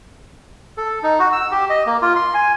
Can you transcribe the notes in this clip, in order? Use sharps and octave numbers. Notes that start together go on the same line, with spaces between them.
A4
D#4
F#4
E6
G4
D#5
A#3
F4
C6
G#5